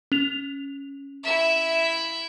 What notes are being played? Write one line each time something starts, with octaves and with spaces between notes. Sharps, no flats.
C#4 F7
E4 E5